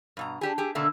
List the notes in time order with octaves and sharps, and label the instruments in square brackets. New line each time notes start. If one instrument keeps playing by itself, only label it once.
[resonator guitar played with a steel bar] G2 B2 A#5
D4 G4 G#4
G4 G#4
B2 D3 A#3 E5